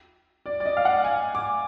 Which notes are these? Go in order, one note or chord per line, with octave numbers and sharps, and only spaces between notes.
D5
D5
D#5
F5
F#5
G#5
D6